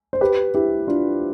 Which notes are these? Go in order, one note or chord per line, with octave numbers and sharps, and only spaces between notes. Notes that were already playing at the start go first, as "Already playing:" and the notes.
C5
G4 B4
E4 G4
D4 F4